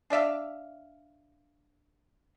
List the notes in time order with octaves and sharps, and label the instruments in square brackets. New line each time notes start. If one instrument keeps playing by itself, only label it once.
[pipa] D4 D5 E5 F5